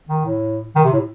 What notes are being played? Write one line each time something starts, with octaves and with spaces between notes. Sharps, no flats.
D#3
A2
D#3
C3
A2